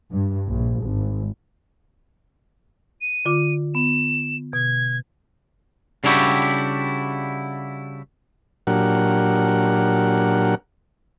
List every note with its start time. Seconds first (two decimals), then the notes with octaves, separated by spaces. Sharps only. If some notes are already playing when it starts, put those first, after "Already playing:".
0.11 G2
0.49 A#1
0.85 G#1
3.01 D#7
3.25 D3 F4 D6
3.75 B3 E7
4.53 B2 G#6
6.04 C#3 G3 D4 E4 F#4 G4
8.67 A#2 F#3 D4 G4 A#4 F#5